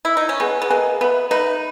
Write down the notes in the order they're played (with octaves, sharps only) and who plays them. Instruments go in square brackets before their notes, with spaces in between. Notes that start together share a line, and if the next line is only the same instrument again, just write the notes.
[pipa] E4
D#4
C#4
[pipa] B3 [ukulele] G#4 B4 D#5 G#5
[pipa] B3
[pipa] A#3 [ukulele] G#4 B4 D#5 G#5
[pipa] B3 [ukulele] B4 E5 B5
[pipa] D#4 [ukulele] B4 E5 B5